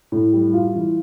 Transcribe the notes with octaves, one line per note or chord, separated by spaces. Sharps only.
A2
G3
F4
E3